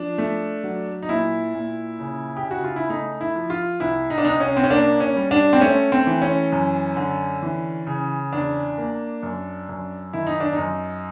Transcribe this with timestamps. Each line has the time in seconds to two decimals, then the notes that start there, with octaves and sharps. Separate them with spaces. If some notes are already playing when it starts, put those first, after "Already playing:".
Already playing: F3 D4
0.18 A3
0.64 F#3
1.02 D#4
1.09 A#2 E4
1.55 A#2
1.99 C#3
2.37 G4
2.45 C#3
2.51 F#4
2.64 F4
2.76 E4
2.90 A3 D#4
3.21 E4
3.35 F3
3.50 F4
3.80 C2 E4
4.10 D#4
4.18 D4
4.25 C2 D#4
4.40 C#4
4.57 C4
4.64 C#4
4.71 A#3 D4
5.00 C#4
5.16 G3
5.31 D4
5.53 C4
5.61 A3 C#4
5.92 C4
6.07 E3
6.22 C#4
6.52 F#2
6.97 D3
7.42 E3
7.87 C#3
8.33 E2 D4
8.78 A#3
9.23 F#2
9.69 F#2
10.13 D#3 E4
10.27 D#4
10.40 D4
10.53 D#4
10.58 F#2